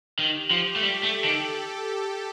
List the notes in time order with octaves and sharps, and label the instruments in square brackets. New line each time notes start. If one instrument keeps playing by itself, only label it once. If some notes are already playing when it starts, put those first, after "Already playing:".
[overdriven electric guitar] D#3 [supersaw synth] G4
[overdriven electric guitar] F3
A3
[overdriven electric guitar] G3 [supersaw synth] A4
[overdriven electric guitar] A3
D#3